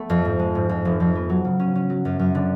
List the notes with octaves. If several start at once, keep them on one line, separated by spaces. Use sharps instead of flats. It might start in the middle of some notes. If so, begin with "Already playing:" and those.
Already playing: A3 B3
F2
G#2
G#3
G#2
F2
F1
F2
B3
F#3
C#3
C#4
C#4
F#3
F#2
F#2
D3